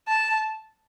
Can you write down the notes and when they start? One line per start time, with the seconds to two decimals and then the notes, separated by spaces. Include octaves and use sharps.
0.08 A5